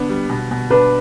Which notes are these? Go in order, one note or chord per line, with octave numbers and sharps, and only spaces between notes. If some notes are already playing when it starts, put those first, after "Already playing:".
Already playing: D3 B3 D4
G3
B2
B2
D4 B4